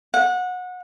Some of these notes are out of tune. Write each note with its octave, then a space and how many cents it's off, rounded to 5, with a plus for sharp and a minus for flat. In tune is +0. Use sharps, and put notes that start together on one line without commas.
F#5 -25